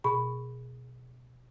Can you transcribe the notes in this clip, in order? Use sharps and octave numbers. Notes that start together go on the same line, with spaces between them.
B2 G#4 B5 C#6